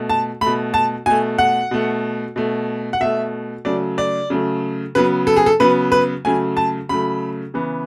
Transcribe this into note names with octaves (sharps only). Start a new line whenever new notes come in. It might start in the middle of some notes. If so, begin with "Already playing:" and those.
Already playing: B2 A3
A5
A3 B5
B2
A5
B2 A3 G#5
F#5
B2 A3
B2 A3
F#5
B2 A3 E5
C#3 F#3 A3 D5
D5
C#3 F#3 A3
C#3 F#3 B3 B4
A4
G#4
A4
C#3 F#3 B3 B4
B4
C#3 F#3 A3 G#5
A5
C#3 F#3 A3 B5
C#3 E3 B3